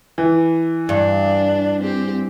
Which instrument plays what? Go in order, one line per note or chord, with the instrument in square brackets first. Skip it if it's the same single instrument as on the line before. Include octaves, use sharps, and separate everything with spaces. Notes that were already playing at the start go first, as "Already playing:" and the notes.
[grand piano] E3
[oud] G2 [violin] D4
[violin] C4 G4